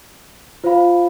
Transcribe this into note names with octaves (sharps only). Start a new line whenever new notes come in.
F4 C5 F5 B5